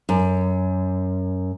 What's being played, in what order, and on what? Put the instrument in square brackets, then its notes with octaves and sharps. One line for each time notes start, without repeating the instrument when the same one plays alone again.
[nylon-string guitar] F#2